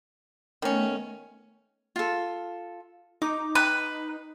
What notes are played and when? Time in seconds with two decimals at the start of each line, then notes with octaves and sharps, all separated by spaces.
0.62 D#3 A3 B3 C#4
1.96 F4 A4
3.22 D#4 D6
3.55 B4